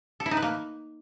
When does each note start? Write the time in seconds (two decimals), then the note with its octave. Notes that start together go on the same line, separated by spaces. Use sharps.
0.20 A4
0.26 E4
0.31 D#4
0.37 B4
0.42 A#3